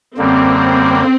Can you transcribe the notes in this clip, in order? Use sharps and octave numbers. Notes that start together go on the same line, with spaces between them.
F#2 D3 G3 A#3 C4